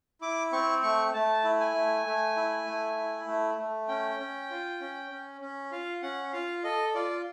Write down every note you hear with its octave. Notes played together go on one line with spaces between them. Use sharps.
E4 D6
C4 C#6
A3 C#6
A3 A5
E4
G#5
A3
A3
E4
A3
E4
A3
A3
C#4 G5
C#4
F4
C#4
C#4
C#4
F4 F5
C#4 F#5
F4 F5
A4 D#5
F4 D5